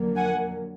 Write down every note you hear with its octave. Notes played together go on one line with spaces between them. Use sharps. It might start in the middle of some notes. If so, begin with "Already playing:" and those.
Already playing: F2 D3 F#3 A#3
F#5 G#5